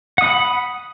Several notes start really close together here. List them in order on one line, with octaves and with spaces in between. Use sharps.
F#5 D#6 B5